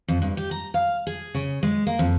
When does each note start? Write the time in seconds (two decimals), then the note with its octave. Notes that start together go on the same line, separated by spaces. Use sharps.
0.08 F2
0.22 G2
0.37 G4
0.51 A#5
0.74 F5
1.07 G#4
1.35 C#3
1.63 G#3
1.87 A#3
1.99 F2